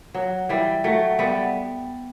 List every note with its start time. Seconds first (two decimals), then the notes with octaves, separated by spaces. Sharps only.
0.14 F#3
0.49 E3 G3
0.84 F#3 A3
1.19 G3 B3